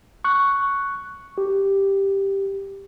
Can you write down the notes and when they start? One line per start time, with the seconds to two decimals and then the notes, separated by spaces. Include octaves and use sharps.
0.24 C#6 F#6
1.38 G4